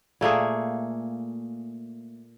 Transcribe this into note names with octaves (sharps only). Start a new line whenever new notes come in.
A#2 A3 A#3 G#4